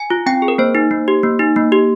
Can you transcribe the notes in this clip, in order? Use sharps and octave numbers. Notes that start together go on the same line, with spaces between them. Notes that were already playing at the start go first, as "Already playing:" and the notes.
Already playing: G#5
F4
C4 G5
G#4
A#4
A#3 C5
D#4
A#3
G4
A#3
D#4
A#3
G4